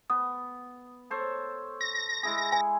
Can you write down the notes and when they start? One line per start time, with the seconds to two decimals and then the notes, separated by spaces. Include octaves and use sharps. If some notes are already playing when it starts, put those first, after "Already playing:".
0.10 B3 D#6
1.10 A4 C5 C#5
1.81 A#6
2.23 G#3 E4 G#4
2.52 G#5